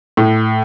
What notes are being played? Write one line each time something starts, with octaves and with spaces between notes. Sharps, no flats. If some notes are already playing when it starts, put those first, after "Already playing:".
A2